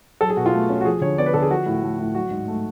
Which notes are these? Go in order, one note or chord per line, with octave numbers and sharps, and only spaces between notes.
F#3 A4
G#4
B2 F#4
F4
A3
C#4
F#4
F3 G#4
D3 C#5
B3 D5
B4
D3 A4
G#4
F3 F#4
A2
A3
A2
F#3 F#4
G#2
A3